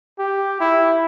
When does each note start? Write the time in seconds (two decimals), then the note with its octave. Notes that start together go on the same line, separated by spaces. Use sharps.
0.19 G4
0.60 E4